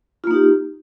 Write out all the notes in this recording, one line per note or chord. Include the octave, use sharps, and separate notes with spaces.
A#3 D#4 F4 G4